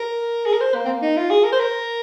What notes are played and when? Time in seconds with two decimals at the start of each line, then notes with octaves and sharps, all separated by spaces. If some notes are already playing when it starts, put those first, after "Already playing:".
Already playing: A#4
0.46 G#4
0.53 A#4
0.60 C5
0.75 A#3
0.85 C4
0.88 A#3
1.02 D#4
1.17 F4
1.30 G#4
1.44 A#4
1.52 C5
1.59 A#4